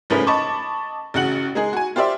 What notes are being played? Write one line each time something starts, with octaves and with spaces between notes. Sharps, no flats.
F#1 G#2 F3 A3 C#4 B4
D#5 A5 B5 C#6 D6
A1 C#3 F#4 F#5 F#7
G#3 D#4 G#4
F#4 G#5
F4 G4 C5 D5 E5